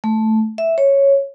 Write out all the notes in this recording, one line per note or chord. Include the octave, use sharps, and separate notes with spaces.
A3
E5
C#5